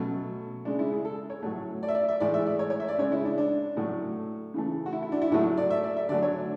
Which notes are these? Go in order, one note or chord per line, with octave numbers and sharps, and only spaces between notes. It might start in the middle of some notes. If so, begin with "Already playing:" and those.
Already playing: B2 F#3 A3 C#4
C#3 G#3 D4
E4
G#4
A4
C#5
A2 F#3 A3
D5
E5
D5
E5
A2 E3 G#3 D5
E5
D5
C#5
C#5
E5
D5
C#3 G#3 C#5
E4
D4
D4
A2 F#3 A3
C#3 E3 A3
F#4
E4
E4
D4
E4
A2 F#3 A3 E4
D5
E5
D5
E5
D3 F#3 A3 D5
C#5
D4